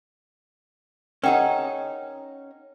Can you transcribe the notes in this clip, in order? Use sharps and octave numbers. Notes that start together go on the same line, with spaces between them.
C#4 D#4 G#4 A#4 F#5 G5